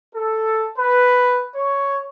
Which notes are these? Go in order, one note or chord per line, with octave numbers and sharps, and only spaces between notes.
A4
B4
C#5